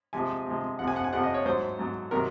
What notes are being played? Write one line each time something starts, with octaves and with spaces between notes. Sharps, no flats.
C3 F3 G#3 G#5
C3 F3 G#3
F2 C3 F3 F#5
G#5
F#5
G#5
F2 C3 F3 F#5
D#5
C#5
G#2 F#3 C5
G#2 F#3
C3 D#3 F#3 A#4